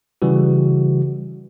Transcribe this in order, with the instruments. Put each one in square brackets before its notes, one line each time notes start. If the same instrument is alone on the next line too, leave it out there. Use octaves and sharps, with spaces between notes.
[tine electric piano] C#3 E3 G3 F#4